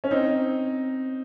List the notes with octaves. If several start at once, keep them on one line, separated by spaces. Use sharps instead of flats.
C#4
C4 D#4